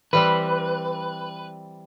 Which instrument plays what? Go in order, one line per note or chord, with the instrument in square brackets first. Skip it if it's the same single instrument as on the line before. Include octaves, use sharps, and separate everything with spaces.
[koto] E3 G3 C4 [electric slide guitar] B4